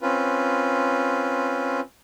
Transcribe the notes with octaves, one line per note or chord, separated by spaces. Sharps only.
C4 C#4 F4 B4